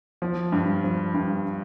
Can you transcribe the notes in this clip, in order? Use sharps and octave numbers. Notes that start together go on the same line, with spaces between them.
F3
G2
F3
G2